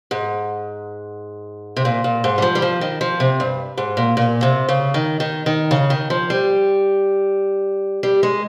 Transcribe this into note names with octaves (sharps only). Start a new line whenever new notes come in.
G#2
C3
A#2
A#2
G#2
G3
F3
G3
F3
D#3
F3
C3
G2
G#2
A#2
A#2
C3
C#3
D#3
D#3
D#3
C#3
D#3
F3
G3
G3
G#3